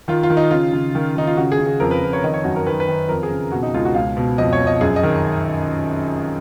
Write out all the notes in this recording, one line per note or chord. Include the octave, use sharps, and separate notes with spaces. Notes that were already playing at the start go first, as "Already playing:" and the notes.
D#3 F4
F4
D#3
D#4
C#3 F4
C#3
D#3
D#3 D#4
F4
C#3 F#4
G#4
C#3
G#4
F2 A#4
B4
F2
C#5
D#3 D#5
C#5
F#2 F#4
A#4
D#3 B4
B4
D#3
F2 A#4
G#4
C#3
B2 F#4
D#4
C#2 F4
F#4
C#2 F5
B2
F2 D#5
C#5
F2
D#5
F#2 G#4
D#5
D#3